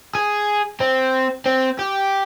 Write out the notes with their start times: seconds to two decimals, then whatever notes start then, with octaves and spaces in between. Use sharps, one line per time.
0.15 G#4
0.81 C4
1.46 C4
1.79 G4